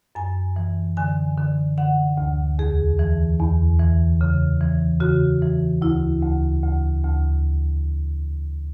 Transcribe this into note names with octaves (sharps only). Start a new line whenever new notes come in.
F#2 G#5
E3
D3 G#5
D3
D3 F#5
D2
E2 G#4
E3
E2
E3
C#3
E3
C#3 F#4
E3
D2 E4
D2
D2
D2